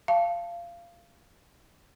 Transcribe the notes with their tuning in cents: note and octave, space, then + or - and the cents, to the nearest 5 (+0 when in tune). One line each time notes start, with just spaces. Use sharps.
F5 -20 A5 +0